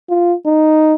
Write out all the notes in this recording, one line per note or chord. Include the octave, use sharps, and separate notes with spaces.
F4
D#4